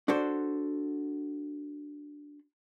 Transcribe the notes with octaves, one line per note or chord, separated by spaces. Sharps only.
D4 F#4 A4 C5